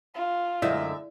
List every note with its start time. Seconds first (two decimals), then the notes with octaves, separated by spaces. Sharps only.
0.15 F4
0.62 F#2 D3 G#3 E4 D5 E5